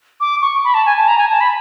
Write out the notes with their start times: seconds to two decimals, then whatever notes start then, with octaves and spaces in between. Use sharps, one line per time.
0.20 D6
0.42 C#6
0.64 B5
0.74 A5
0.86 G#5
0.97 A5
1.08 A#5
1.18 G#5
1.30 A5
1.40 B5